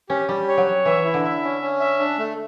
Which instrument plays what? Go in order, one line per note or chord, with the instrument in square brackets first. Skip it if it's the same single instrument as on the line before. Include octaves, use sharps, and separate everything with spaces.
[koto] C#4 [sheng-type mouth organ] G4
[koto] G3 [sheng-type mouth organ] G4
[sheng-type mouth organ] C#5
[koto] F#3
[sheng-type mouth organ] C#5
[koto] E3 [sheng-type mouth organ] E5
[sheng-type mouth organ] E4
[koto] D3
[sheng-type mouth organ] E5
C#4
C#4
E5
D4
A3